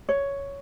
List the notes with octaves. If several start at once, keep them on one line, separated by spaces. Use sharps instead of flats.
C#5